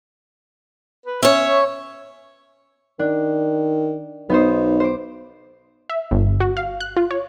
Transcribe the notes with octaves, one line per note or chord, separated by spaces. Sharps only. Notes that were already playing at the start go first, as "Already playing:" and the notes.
B4
C#4 C#5 E5
D#3 D4
B1 B3 D#4 C5
C5 D6
E5
G1
F#4
F5
F#6
F4
C#5